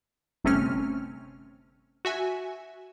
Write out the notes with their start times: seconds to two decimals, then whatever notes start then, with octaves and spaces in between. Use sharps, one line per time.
0.44 G1 C3 A3 C4 C#4 F6
2.05 F#4 E5 G#5